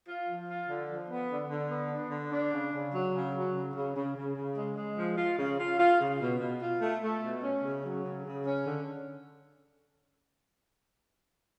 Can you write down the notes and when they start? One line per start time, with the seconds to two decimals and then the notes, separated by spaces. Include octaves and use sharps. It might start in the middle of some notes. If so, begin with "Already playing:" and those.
0.07 F4
0.27 F3
0.48 F4
0.69 D3
0.88 F3
1.09 B3
1.29 D3
1.50 D3
1.70 B3
1.91 D4
2.11 D3
2.32 D4
2.52 C#3
2.73 C#3
2.93 F#3
3.13 C#3
3.33 F#3
3.55 C#3
3.75 C#3
3.96 C#3
4.15 C#3
4.35 C#3
4.56 G#3
4.76 G#3
4.98 F3
5.18 F4
5.39 C#3
5.59 F4
5.79 F4
6.00 C#3
6.21 B2
6.41 B2
6.61 F4
6.81 A3
7.02 A3
7.22 B2
7.42 C#4
7.63 C#3
7.84 F#3
8.04 C#3
8.25 C#3
8.45 C#4
8.66 D3